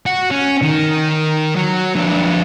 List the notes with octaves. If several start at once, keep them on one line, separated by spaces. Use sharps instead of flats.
F#4
C#4
D#3
F#3
F2 D4